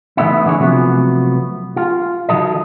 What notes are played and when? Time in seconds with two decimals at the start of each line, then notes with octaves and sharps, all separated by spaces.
0.17 E3 A3 B3 D#4 E4
0.45 D3 E3 D4 G#4 C#5
0.59 C3 F3 F#3 A3 B3
1.76 F4
2.29 D#3 F#3 A4 D#5